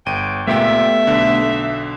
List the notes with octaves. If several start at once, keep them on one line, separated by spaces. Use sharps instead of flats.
G1 G5 D#7
C#2 A#2 A3 B3 G4 E5 G5
B1 D3